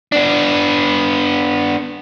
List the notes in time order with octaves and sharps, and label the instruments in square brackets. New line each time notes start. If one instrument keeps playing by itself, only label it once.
[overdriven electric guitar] B3 D4